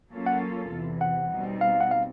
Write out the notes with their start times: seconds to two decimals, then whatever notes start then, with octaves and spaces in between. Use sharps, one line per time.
0.12 F#3 A#3 C#4 F4 A4
0.26 F#5
0.71 E2 C3 E3
1.01 F#5
1.31 B2 G3 C4 D#4
1.61 F5
1.81 F#5
1.91 F5